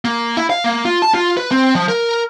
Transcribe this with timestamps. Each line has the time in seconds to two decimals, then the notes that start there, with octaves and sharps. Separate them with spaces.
0.05 A#3
0.37 E4
0.50 F5
0.64 A#3
0.85 F4
1.02 A5
1.14 F4
1.37 B4
1.51 C4
1.75 F3
1.89 A#4